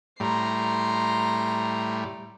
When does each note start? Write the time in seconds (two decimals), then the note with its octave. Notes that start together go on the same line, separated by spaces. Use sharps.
0.20 A2 G3 A#5 C6